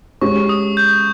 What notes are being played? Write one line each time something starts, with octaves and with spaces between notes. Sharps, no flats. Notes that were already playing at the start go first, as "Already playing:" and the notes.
G#3 C#4 G4 C#6
D#6
G6